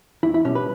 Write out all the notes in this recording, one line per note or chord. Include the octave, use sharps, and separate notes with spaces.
E2 E4
E4
B2 G3 C#4
B4